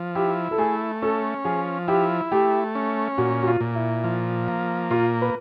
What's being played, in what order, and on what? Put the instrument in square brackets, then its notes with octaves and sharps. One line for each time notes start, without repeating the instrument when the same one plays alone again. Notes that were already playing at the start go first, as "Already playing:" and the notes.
Already playing: [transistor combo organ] F3
[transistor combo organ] E4 [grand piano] G4
[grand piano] A4
[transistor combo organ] A3 [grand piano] G#4
[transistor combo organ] C#4 [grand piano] A4
[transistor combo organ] F3 [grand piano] G#4
[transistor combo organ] E4 [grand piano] G4
[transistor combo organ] A3 [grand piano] G4
[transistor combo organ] C#4
[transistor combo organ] A#2 [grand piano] F#4
[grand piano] F#4
F4
[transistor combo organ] A#2
[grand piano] E4
[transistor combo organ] F3
A#3
[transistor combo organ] A#2 [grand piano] F4
[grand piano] B4